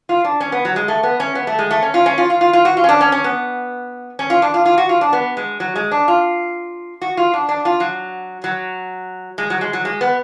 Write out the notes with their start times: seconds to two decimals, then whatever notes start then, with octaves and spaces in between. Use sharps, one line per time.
0.09 F4
0.24 D4
0.40 C#4
0.52 B3
0.65 F#3
0.76 G#3
0.88 A3
1.03 B3
1.20 C#4
1.35 B3
1.47 A3
1.59 G#3
1.71 A3
1.82 C#4
1.94 F4
2.06 C#4
2.18 F4
2.30 F4
2.41 F4
2.53 F4
2.65 F#4
2.77 F4
2.84 C#4
2.89 D4
3.01 C#4
3.12 C#4
3.24 B3
4.19 C#4
4.30 F4
4.42 D4
4.54 F4
4.65 F4
4.78 F#4
4.89 F4
5.01 D4
5.13 B3
5.37 G#3
5.60 F#3
5.76 G#3
5.91 D4
6.08 F4
7.01 F#4
7.17 F4
7.34 D4
7.49 D4
7.65 F4
7.80 F#3
8.44 F#3
9.38 G#3
9.50 F#3
9.61 G#3
9.73 F#3
9.85 G#3
10.01 B3